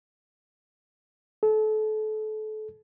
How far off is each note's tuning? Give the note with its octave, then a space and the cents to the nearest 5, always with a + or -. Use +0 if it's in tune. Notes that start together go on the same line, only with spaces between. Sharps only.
A4 -30